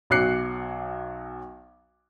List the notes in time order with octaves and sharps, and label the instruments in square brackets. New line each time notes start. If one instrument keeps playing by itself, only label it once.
[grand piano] B1 F#3 D6 F#6 C7 C#7